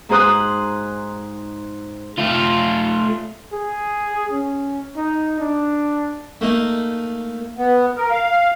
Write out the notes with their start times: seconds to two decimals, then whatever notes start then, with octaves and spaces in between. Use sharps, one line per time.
0.09 G#2 D#4 G#4 C5 D#6 F#6
2.18 A3 F4
3.53 G#4
4.31 C#4
4.97 D#4
5.40 D4
6.41 A3 A#3 D#4
7.58 B3
7.97 A#4
8.11 F5